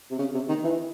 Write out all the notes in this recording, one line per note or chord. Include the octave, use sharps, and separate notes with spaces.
C3
C#3
C3
D#3
E3